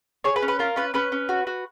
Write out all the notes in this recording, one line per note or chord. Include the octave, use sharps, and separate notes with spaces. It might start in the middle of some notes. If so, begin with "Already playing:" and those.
G#4 C#5
B4
C#4
B4
F4 A#4
C#4 B4
C#4 B4
C#4
F#4
F#4